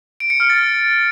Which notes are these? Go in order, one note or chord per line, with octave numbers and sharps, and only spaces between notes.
D7
C#7
F6
A6